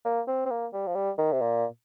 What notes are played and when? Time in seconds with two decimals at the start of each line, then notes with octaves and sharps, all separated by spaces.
0.05 A#3
0.27 C4
0.45 C4
0.50 A#3
0.73 G3
0.87 F3
0.95 G3
1.18 D#3
1.32 C3
1.41 A#2